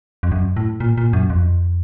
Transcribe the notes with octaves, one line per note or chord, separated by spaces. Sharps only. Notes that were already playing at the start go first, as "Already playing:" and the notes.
F2
F#2
A2
A#2
A#2
F#2
F2